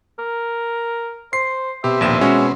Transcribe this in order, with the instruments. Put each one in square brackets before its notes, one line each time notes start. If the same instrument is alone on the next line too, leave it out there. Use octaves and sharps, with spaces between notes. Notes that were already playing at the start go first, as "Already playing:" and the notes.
[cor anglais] A#4
[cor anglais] C5 [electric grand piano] C7
[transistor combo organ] B2 C4 [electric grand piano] G4 [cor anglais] E5
[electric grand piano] A#1 D#2 E7
G#3 C#4 F#4